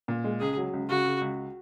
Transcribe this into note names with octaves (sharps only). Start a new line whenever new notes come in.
A#2
G#3
C#2 G#4
F#3
C#2
C#3 F#4
C#3
C#2